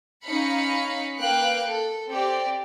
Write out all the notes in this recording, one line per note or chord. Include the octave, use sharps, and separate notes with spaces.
C#4 D#4 F5 B5 C#7
A#3 B4 F5 G5 F#6 D7
A4
C4 G4 D5